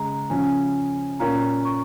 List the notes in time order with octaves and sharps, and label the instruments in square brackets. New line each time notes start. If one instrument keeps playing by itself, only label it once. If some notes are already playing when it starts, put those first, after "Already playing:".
Already playing: [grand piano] C#3 G#3 [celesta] A#5
[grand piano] C#3 F3 C#4 [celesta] G#5
[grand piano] A#2 A#3 C#4 F4 [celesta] A#5
[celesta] C#6